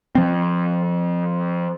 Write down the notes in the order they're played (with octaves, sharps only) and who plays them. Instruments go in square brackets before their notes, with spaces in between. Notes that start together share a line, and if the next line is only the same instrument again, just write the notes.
[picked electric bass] F3 C4